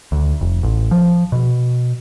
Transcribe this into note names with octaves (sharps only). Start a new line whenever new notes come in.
D2
F1
A1
F3
B2